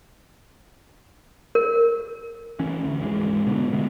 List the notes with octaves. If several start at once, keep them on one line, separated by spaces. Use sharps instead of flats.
A#4
E3 C#4
D2
G#1 G#2 E3 G#3
B2 D3 B3
D3 G#3 B3